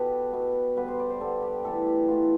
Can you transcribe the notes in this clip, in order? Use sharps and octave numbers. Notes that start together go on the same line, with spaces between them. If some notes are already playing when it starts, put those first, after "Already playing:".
Already playing: B2 B3 G4 A4 B4
B2 B3
D3 G3 B3 B4
C5
D5
C5
D3 G3 B3 A4
G4
A2 E3 B3 A4
G4
A2 E3 B3 F4